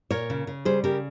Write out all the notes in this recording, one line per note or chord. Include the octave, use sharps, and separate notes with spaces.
A#2 A#4 C#5
C#3
C#3
G3 G#4 C5
C#3 G4 A#4